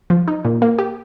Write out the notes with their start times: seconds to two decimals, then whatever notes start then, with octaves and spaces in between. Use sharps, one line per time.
0.10 F3
0.28 D#4
0.45 A#2
0.62 A#3
0.79 G4